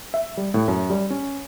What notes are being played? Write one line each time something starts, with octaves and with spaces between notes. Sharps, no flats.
E5
G3
A2
F#2
G3
C#4